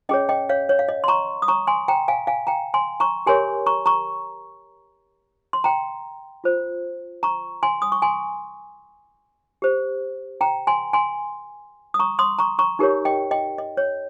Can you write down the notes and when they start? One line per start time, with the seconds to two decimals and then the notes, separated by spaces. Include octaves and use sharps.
0.09 C#4 G#4 C#5 D#5 G5
0.29 D#5 G5
0.49 C#5 F5
0.69 C#5
0.79 F5
0.89 D#5
1.04 C6
1.08 A#5 C#6
1.42 D#6
1.48 A#5 C#6
1.67 G#5 C6
1.88 G5 A#5
2.08 F5 G#5
2.27 F5 G#5
2.47 G5 A#5
2.74 G#5 C6
3.00 A#5 C#6
3.26 G4 A#4 C#5 G#5 C6
3.66 A#5 C#6
3.86 A#5 C#6
5.53 C6
5.64 G5 A#5
6.44 F4 C5
7.23 A#5 C#6
7.63 G#5 C6
7.82 D#6
7.92 C#6
8.02 G#5 C6
9.62 G4 C5
10.41 G5 A#5
10.67 G#5 C6
10.93 G#5 C6
11.94 D#6
11.99 A#5 C#6
12.19 C6 D#6
12.39 A#5 C#6
12.59 A#5 C#6
12.79 D#4 G4 A#4 C#5
13.05 D#5 G5
13.31 D#5 G5
13.58 D#5
13.77 C#5